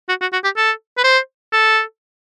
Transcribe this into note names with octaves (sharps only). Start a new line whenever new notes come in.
F#4
F#4
F#4
G4
A4
B4
C5
A4